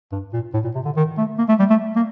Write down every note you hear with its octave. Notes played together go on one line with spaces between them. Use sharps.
G2
A#2
A2
A#2
C3
D3
D#3
A3
A#3
A3
G3
A3
A#3